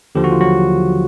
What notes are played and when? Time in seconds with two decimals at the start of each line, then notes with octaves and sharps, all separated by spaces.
0.15 D#2 D3 F3 G4
0.24 F#4
0.32 F4
0.41 F#3 F#4